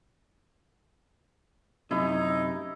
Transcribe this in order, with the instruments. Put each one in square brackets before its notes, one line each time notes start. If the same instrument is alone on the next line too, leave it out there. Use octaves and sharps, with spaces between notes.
[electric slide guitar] F#2 C3 [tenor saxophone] D#4 [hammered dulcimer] E4